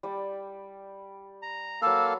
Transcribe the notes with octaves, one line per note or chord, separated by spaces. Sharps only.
G3 D5 G5
A#5
F#3 A#3 A4 B4 F5 E6